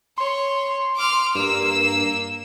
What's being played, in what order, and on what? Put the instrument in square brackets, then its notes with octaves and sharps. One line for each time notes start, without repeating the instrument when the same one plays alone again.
[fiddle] C#5 [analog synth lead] C6
[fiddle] D6 F6
[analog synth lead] G2 [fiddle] A#3 E6